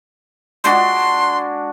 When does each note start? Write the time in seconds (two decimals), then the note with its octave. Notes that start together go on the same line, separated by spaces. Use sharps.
0.64 G#3 D4 F#4 C6